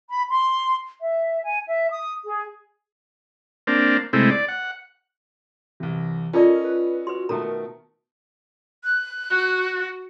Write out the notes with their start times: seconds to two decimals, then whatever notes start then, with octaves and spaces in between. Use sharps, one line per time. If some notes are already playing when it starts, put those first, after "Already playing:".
0.09 B5
0.29 C6
1.00 E5
1.43 G#5
1.68 E5
1.90 D#6
2.25 G#4
3.67 A#3 C4 D4
4.13 C3 G#3 A3 C4 E4
4.31 D5
4.48 F#5
5.80 C2 C3 E3
6.33 C#4 F4 A4 A#4 D5 D#5
6.64 B4
7.07 F#4 B4 C6
7.29 B2 D#3 A3 F#4 A4 A#4 A#5
8.84 F#6
9.30 F#4